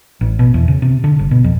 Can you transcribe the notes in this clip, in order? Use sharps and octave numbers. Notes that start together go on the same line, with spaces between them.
A1
B2
E2
C#3
C3
D3
G1
B2
F2